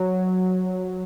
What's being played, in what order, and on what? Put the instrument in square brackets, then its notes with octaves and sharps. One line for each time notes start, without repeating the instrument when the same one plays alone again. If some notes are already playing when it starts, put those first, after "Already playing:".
Already playing: [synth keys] F#3